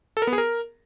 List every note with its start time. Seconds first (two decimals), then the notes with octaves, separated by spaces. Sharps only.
0.17 A4
0.22 A#4
0.27 B3
0.33 G#4
0.38 A#4